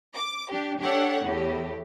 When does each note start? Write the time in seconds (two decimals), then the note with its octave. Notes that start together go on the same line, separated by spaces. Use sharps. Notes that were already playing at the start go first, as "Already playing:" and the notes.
0.15 D6
0.51 D4 G4
0.80 D4 G4 A4 C#5 F#5
1.24 E2 A2 G4